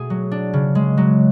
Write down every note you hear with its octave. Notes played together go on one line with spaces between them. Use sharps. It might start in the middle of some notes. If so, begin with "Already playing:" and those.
Already playing: B2 A3 G#4
F#3
D4
C#3
G#3
F#3